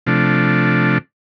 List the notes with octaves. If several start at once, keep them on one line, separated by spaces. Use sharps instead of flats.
C3 F3 A3 D4